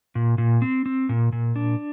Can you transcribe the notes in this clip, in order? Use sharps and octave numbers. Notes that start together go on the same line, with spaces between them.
A#2
A#2
C4
C4
A#2
A#2
D4